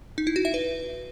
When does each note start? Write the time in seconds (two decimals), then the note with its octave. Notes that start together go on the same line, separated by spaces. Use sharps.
0.18 D#4
0.27 E4
0.36 F#4
0.45 E5
0.54 B4